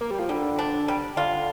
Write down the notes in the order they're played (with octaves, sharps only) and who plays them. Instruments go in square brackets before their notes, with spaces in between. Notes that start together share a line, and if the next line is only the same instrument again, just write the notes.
[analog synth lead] A#3
G3
F3
[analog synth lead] D3 [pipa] G3
[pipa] D4
G3
[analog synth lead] D3 [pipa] F4